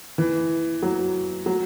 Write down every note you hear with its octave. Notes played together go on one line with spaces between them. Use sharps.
E3
F#3
F#3